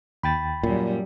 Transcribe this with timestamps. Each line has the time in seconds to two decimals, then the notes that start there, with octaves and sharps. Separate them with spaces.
0.23 D#2 G5 B5 A6
0.63 F#2 A#2 G3